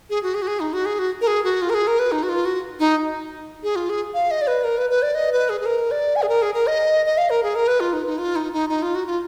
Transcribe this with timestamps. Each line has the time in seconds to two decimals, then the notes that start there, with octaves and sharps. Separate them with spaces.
0.10 G#4
0.23 F#4
0.34 G#4
0.42 F#4
0.47 G#4
0.60 D#4
0.73 F#4
0.85 G#4
0.99 F#4
1.21 A#4
1.27 G#4
1.44 F#4
1.62 F4
1.70 A#4
1.74 G#4
1.87 A#4
1.99 B4
2.12 D#4
2.23 F#4
2.29 F4
2.45 F#4
2.79 D#4
3.63 G#4
3.76 F4
3.89 G#4
4.14 F5
4.31 D#5
4.41 D5
4.47 B4
4.64 A#4
4.78 B4
4.90 B4
5.02 D5
5.15 D#5
5.33 B4
5.49 G#4
5.61 G#4
5.66 A#4
5.91 D5
6.16 G#5
6.22 G#4
6.29 A#4
6.42 G#4
6.54 A#4
6.67 D#5
7.06 D#5
7.18 F5
7.30 A#4
7.43 G#4
7.55 A#4
7.68 B4
7.80 F4
7.93 D#4
8.06 D#4
8.18 F4
8.36 D#4
8.53 D#4
8.69 D#4
8.82 F4
8.95 F#4
9.06 F4